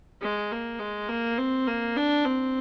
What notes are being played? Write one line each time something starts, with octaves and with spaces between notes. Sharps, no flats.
G#3
A#3
G#3
A#3
C4
A#3
D4
C4